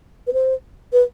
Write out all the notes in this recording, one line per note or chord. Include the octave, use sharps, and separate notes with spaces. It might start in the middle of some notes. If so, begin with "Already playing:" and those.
B4
C5
B4